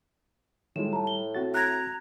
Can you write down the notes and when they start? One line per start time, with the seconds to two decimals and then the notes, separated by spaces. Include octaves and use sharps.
0.76 A2 D#3 G3 G#3 F4 E7
0.93 G3 A5 A#5
1.07 G7
1.35 C4 F#4 A6
1.54 A#5 F#6 G#6 A#6